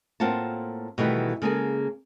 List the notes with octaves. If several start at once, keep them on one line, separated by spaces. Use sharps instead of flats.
A2 A#3 C4 F4 F#5 A5
B2 D#3 E3 G3 A3 B3
C#3 G#3 A#3 G#4 A4 G#5